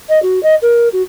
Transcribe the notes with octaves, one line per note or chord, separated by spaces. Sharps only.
D#5
F#4
D#5
A#4
F#4